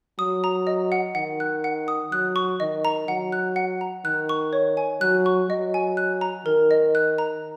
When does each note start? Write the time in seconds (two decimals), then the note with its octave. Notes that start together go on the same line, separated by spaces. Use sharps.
0.19 F#3 D#6
0.44 A#5
0.67 D#5
0.92 F#5
1.15 D#3 F#5
1.40 F#6
1.64 F#5
1.88 D#6
2.12 F#3 F#6
2.36 C#6
2.60 D#3 D#5
2.85 A#5
3.08 F#3 F#5
3.32 F#6
3.56 F#5
3.81 A#5
4.05 D#3 F#6
4.29 C#6
4.53 C#5
4.77 G#5
5.01 F#3 F#6
5.26 C#6
5.49 F#3 D#5
5.74 G#5
5.97 F#6
6.21 A#5
6.46 D#3 A#4
6.71 D#5
6.95 F#6
7.18 A#5